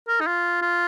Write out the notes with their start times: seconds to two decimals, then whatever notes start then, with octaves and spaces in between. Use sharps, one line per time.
0.08 A#4
0.21 D#4
0.27 F4
0.62 F4